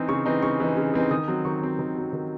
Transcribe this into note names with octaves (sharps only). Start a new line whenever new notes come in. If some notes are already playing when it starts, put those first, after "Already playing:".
Already playing: E3 C4 D#4
C#3 C#6
E3 C4 D#4
C#3 C#6
E3 C4 D#4
C#3
E3 C4 D#4
D#3 D#6
F#3 C4
D#3 C#6
F#3 C4
D#3
F#3 C4
D#3